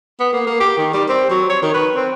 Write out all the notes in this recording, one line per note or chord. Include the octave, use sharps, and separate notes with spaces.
B3
A#3
A#3
G4
D#3
G3
C4
F#3
C#5
D#3
B4
C4